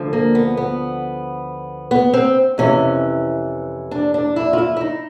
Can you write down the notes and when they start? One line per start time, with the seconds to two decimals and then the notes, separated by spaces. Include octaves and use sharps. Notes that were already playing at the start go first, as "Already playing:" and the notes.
Already playing: D2 D3 F3
0.13 A#3
0.35 B3
0.57 B3
1.91 B3
2.13 C4
2.58 F2 C3 E3 C#4
3.91 D4
4.14 D4
4.36 E4
4.53 F4
4.58 E4
4.76 E4
4.81 D#4